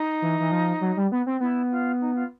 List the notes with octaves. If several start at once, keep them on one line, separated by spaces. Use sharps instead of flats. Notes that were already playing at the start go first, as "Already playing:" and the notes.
Already playing: D#4
E3
E3
F3
F#3
G3
B3
C4
B3 E4
F4
D#4
F4